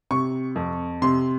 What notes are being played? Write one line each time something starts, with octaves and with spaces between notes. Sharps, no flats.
C3 C#6
F2
C3 C6